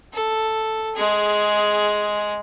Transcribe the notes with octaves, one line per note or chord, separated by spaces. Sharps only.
A4
G#3 G#4